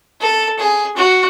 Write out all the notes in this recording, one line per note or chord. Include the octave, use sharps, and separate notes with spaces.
A4
G#4
F#4